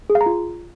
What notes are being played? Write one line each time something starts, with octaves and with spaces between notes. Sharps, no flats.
G#4
F5
A#5
F4